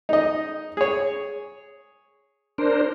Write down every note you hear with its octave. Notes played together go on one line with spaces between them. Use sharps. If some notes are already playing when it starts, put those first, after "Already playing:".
D#4 D#5
G#4 C#5
D4 A#4 C5